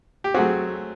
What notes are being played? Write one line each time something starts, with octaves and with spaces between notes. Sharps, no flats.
G4
F#3 A3 C4 F#4 G#4